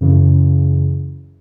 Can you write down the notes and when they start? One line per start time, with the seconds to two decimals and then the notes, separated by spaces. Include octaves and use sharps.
0.01 F#2 C#3 E3